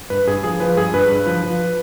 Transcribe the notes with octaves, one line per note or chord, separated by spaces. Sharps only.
G2 B4
G2 G#4
F3 G#4
F3 B4
G2 G#4
G2 B4
G2
F3
F3